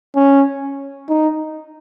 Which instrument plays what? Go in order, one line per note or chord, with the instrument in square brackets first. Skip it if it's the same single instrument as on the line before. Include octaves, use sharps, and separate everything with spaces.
[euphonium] C#4
D#4